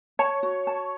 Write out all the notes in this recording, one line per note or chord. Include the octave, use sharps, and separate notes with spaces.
C#5 A5
F#4
A5